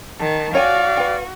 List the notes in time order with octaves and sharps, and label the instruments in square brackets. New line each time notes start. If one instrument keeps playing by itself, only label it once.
[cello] D#3 [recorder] A5
[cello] F#4 [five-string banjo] C#5 G5 G#5 [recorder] D5 [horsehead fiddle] F5
[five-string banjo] B4 G5